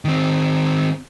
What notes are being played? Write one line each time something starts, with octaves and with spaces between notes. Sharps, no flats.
D#3 C4